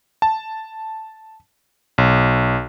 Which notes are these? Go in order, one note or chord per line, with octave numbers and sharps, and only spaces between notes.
A5
B1